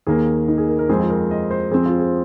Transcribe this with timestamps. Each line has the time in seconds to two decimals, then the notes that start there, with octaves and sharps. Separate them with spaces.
0.07 D#2 D#3 A#3 G#4
0.48 D#4
0.58 G#4
0.69 A#4
0.79 A#4
0.89 F2 F3 G#3 C4 G#4
1.00 F4
1.10 A#4
1.31 D#5
1.51 C5
1.71 F2 F3 C4 G#4
1.86 F4
1.99 G#4